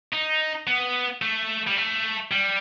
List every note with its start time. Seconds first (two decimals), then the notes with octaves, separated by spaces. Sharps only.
0.13 D#4
0.67 B3
1.22 A3
1.67 G3
1.77 A3
2.31 G3